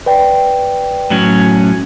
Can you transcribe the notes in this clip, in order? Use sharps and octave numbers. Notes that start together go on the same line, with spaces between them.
B4 D5 G5
A2 F#3 C#4